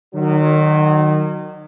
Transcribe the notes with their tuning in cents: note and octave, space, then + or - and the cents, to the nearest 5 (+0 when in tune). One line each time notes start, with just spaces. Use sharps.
D#3 -30 F#3 +0